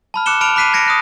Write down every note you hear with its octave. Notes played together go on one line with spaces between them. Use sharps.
A5 B5 F6
D6 F#6 C#7 E7 G7
A5 B5 F6 D7 F7
B5 D6 F#6 B6 C7 D#7
G#6 A#6 C#7 D7
D#6 F#6 A#6